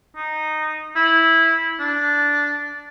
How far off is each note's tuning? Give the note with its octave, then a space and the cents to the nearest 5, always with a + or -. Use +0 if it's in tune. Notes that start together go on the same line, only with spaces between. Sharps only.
D#4 -10
E4 -10
D4 -10